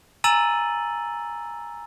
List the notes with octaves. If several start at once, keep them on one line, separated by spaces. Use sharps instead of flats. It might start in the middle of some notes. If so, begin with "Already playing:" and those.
G#5 A#5 E6 A6 D#7 F#7